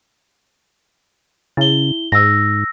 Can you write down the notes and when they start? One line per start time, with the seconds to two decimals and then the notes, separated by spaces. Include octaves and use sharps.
1.57 C#3 E4 G7
2.12 G#2 E6 A#6